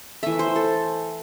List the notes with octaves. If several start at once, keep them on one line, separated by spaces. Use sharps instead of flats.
E3 A3 E5
C5
A4